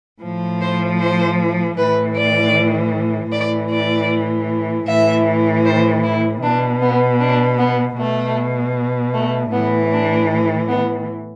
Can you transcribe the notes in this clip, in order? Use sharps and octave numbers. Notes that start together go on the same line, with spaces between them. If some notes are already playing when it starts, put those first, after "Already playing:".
A2 F3
C5
C5
A2 E3 B4
D5
A2 E3 D5
D5
A2 E3 E5
C5
E4
B2 D4
B3
D4
B3
B2 A3
A3
A2 E3 B3
D4
B3